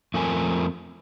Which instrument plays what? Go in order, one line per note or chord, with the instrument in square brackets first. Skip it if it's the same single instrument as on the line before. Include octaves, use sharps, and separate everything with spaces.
[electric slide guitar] F2 F3 A3 C4 A#4 G#5